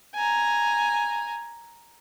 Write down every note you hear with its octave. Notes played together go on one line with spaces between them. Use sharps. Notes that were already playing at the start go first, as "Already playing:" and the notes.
G#5 A#5